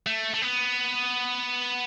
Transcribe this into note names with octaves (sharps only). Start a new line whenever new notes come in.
A3
A3
B3